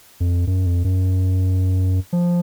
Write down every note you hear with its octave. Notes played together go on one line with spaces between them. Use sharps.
F2
F#2
F2
F#2
F3